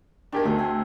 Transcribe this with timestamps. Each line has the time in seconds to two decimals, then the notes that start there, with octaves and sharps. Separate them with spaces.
0.32 D#3 D4 G4 A#4 G#5
0.45 D2 G#4 A4 E5
0.58 C4 G#5